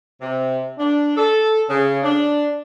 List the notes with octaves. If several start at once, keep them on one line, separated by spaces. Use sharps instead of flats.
C3
D4
A4
C#3
D4